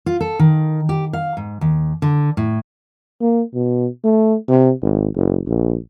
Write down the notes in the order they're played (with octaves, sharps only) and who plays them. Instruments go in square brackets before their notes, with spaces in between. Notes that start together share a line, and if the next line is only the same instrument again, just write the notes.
[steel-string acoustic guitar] F4
A4
D#3
G4
F5
G#2
D#2
D3
A2
[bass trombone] A#3
B2
A3
C3
G#1
F#1
A#1